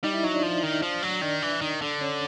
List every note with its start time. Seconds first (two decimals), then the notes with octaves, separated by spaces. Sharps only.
0.04 G3 D#4 D#5
0.14 E4 E5
0.23 F#3 D#4 D#5
0.34 D4 D5
0.43 F3
0.63 D#3
0.82 F3
1.02 F#3
1.22 D#3 D4 D5
1.42 E3
1.61 D#3
1.82 D3
2.01 C#4 C#5